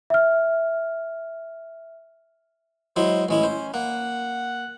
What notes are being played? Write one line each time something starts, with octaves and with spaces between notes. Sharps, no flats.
E5 F6
F#3 G#3 E4 C5
A1 G#3 C#4 E4
C5
A#3 F#5